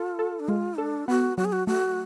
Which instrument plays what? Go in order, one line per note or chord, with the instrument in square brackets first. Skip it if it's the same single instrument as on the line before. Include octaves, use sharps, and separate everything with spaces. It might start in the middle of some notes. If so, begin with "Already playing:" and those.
Already playing: [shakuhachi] F4 [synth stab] A4
[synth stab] A4
[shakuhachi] D4
[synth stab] G#3 [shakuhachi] F4
[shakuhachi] D4 [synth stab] A4
[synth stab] B3 [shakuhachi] F#4
[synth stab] F#3 [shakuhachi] F#4
[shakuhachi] G#4
F#4
[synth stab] A3 [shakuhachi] F#4